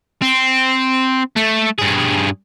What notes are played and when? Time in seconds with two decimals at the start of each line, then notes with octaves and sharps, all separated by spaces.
0.22 C4
1.36 A3
1.78 G2 G#4